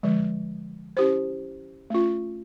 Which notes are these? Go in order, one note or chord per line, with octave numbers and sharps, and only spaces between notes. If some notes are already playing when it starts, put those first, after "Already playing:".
D3 F3 G#3
C#4 E4 G4 C5
A3 C#4 F4